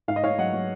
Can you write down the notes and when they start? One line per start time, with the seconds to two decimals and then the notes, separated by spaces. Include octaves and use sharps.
0.08 G#2 F5
0.16 D#5
0.24 G#2 C#5 F5
0.38 F#3 D#5 F#5
0.53 F#3